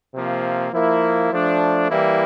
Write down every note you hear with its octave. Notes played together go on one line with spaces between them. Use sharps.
C3 F3 A#3
F3 A#3 E4
F3 A3 D4
E3 G3 A#3 E4